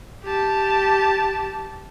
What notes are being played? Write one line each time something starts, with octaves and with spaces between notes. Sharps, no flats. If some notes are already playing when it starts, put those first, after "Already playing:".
G4 A5